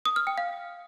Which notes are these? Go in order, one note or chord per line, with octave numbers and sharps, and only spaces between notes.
D#6
F6
G5
F5